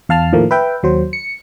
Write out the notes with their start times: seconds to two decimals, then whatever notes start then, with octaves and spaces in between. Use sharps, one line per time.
0.09 E2 F5 A5 F6
0.33 A2 D#3 F3 A3 A#3
0.51 B4 E5 G5
0.83 D#2 F#3 C5
1.13 C#7